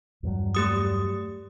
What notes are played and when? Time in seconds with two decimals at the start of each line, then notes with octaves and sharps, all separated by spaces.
0.23 E2 G2 F#3
0.55 A3 G4 D#6